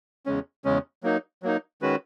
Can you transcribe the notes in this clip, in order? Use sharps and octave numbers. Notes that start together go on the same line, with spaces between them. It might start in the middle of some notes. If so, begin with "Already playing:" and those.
E2 C#3 G#3 C#4
E2 C#3 G#3 C#4
F#3 A#3 D#4
F#3 A#3 D#4
D#3 G#3 C#4 F#4 B4